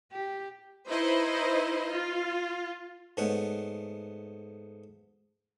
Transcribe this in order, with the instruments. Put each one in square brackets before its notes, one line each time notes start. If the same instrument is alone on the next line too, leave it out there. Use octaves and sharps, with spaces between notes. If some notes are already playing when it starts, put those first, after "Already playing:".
[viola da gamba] G4
[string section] D#4 E4 B4 C5 D#5
F4
[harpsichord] G#2 A3 B3 C#5 F#5